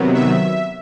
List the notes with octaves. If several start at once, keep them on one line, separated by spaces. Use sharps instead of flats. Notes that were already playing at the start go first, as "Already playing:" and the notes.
Already playing: C3 D#3 F#3 B3
E5